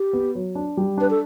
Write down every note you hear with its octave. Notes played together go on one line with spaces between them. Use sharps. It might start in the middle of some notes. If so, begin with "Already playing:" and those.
Already playing: G4
B3
F#3
D4
G3
D4 B4
A4